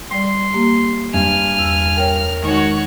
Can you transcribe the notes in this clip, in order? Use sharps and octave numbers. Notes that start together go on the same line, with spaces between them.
G3 D5 C6
A#3 G4
G2 G#5 F6
E2 E6
A#4 C#5 G5
D#3 G#3 D#4 F#4 C#5